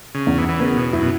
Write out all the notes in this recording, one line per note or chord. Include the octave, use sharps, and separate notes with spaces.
C#3
E2
E3
E3
C#3 B3
B2
F#2 E4
B2